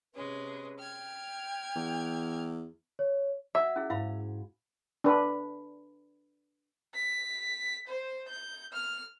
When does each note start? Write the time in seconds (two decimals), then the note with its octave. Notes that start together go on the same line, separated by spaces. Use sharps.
0.14 C3 G#3 C#4 B4
0.78 G5 F6 G#6
1.76 E2
2.99 C#5
3.55 F#4 E5 G#5
3.76 C#4 E4 G#4
3.90 G#2 E4 F5 B5
5.04 D4 B4
6.95 B6
7.88 C5
8.28 G6
8.73 F6